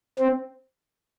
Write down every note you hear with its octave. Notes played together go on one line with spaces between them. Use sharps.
C4